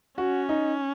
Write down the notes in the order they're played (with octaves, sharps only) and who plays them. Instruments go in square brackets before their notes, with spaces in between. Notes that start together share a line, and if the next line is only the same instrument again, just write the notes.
[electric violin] C#4 [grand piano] F#4
[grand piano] D#4